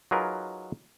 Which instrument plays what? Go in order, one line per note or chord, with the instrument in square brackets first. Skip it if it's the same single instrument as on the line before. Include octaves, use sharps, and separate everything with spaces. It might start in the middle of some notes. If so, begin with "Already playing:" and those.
[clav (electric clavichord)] F#3 D#4 F4 G#4 A#4 B4